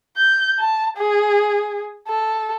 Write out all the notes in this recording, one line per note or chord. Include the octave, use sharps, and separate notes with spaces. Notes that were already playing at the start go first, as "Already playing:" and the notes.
G6
A5
G#4
A4